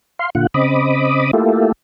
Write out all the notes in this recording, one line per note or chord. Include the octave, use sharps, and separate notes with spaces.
F5 C6
A#2 D3 F4 F#5
C#3 C4 D#5 B5 D6 D#6
A3 A#3 E4 F4 G4 A4